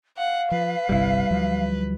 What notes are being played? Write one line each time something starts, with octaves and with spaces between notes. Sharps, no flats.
F5 F#5
F3 B4
G1 C2 C3 G3 E4
D2 F3 F#3